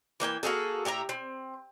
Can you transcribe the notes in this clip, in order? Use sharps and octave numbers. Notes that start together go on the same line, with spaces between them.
E3 A#3 G5 G#5
A#3 F#4 G#4 A4
A2 G4 E5 A#5
C4